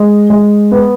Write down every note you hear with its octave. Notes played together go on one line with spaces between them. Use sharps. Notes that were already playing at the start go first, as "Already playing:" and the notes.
Already playing: G#3
G#3
B3